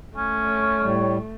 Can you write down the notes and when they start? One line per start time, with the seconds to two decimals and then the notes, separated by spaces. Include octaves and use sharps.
0.17 A3 C#4
0.47 C#5
0.84 A2 G3